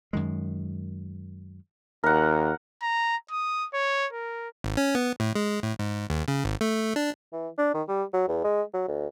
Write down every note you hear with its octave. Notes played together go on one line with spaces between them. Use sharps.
F#2 D#3 G#3
D#2 A#4 F#5
A#5
D#6
C#5
A#4
G#1
C#4
B3
A2
G#3
A2
G#2
D#2
C#3
G#1
A3
D4
E3
D4
D#3
G3
F#3
E2
G#3
F#3
D2